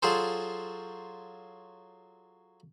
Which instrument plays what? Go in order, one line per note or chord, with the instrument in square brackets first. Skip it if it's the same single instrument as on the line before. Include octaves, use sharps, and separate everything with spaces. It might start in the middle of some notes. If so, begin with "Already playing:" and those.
[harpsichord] F#3 F4 G#4 A4 C5